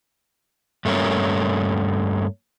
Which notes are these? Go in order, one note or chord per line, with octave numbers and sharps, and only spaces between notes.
G2 A3 A#3 C#4 A#4